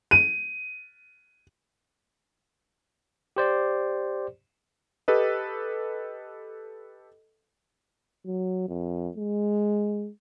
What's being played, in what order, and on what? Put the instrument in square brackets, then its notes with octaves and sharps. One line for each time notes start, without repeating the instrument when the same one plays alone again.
[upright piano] D#7
[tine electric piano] G4 C5 D5
[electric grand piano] G4 A4 B4 D#5
[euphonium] F#3
F2
G#3